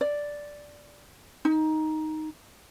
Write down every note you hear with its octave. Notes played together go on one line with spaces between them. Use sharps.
D5
D#4